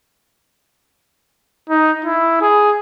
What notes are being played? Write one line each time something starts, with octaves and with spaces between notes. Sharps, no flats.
D#4
E4
G#4